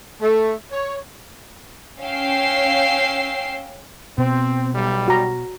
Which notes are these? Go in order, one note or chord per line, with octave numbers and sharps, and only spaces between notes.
A3
C#5
C#4 F5 G5 E6 C7
B2 C4
B1 G3
F#4 A#5